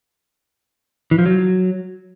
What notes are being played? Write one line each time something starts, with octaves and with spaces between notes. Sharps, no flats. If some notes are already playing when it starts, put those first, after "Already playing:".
E3
F3
F#3